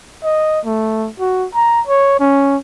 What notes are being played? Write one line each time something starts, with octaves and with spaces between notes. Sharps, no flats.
D#5
A3
F#4
A#5
C#5
C#4